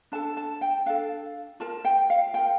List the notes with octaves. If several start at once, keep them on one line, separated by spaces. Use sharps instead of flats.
D4 A4 A5
A5
G5
D4 A4 F5
F4 A#4 A5
G5
F5
F4 A#4 G5